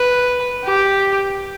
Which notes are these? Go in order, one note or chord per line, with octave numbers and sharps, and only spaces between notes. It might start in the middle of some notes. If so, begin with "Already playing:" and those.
Already playing: B4
G4